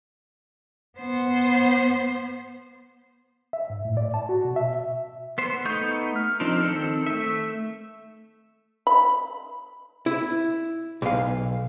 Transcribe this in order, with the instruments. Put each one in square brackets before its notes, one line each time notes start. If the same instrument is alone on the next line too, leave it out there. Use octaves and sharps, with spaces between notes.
[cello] B3 C5
[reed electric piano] E5
G#2
A2
D5
A5
F#4
B2
E5
[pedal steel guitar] B3 C5
A3 B3 D#4 C#6 G6
F6
F3 C4 D4 D#4 A#4
D#3 C4 A4
A3 E5
[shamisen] B5
[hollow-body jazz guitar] E4
B1 F5